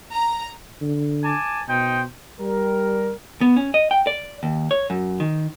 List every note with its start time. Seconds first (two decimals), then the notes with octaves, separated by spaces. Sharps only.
0.13 A#5
0.81 D3
1.23 G#5 A5 D6
1.68 B2 D#4 C5 G5
2.39 G3 A#4
3.41 B3
3.56 C#4
3.74 D#5
3.91 G5
4.07 D5
4.43 D#2
4.71 C#5
4.90 F#2
5.20 D#3